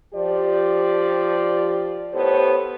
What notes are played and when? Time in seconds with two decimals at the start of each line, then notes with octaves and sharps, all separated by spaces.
0.14 F3 G4 D5
2.13 A2 B3 G4 A4 C5 C#5